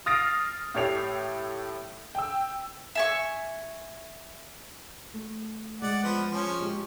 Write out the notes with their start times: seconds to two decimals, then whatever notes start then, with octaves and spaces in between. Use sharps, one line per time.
0.06 D#6 F6 A6 A#6 C7 D7
0.75 A2 G4 A4 C#5 C7 F7
2.15 G5 E6
2.95 E5 G#5 C#6
5.14 A3
5.82 G#3 D5 F#5
6.03 F3 B3
6.31 F3 C#4
6.59 G#3 G4